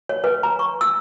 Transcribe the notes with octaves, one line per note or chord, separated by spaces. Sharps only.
C#5
B4
A#5
C#6
E6